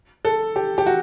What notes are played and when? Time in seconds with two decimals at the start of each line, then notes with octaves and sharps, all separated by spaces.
0.25 A4
0.56 G4
0.78 G4
0.86 F#4